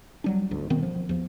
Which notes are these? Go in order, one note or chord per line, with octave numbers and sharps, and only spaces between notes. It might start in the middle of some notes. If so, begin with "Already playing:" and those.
F#3 G3 D4
G1 D2
B2 D#3 B3 C4
F3
E2 F3